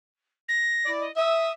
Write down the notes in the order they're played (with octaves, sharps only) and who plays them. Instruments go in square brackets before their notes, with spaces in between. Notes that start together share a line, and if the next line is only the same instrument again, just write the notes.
[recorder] A#6
[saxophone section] E4 D5
[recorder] D#5
[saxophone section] E5 [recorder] D#6